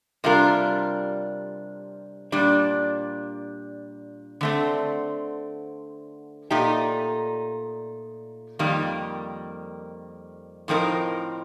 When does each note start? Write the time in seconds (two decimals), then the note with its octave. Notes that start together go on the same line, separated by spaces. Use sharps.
0.24 C3 G3 D4 F4 A#4
2.32 A#2 G3 D4
4.41 D3 A3 C4
6.50 A#2 A3 D#4 G4
8.59 F2 D#3 G3 A#3
10.68 A2 F3 C4 D#4 A#4